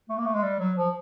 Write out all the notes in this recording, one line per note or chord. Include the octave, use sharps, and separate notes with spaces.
A3
A#3
A3
G#3
G3
F#3
F3